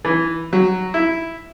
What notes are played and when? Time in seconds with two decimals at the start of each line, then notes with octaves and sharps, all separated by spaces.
0.05 E3
0.53 F#3
0.94 E4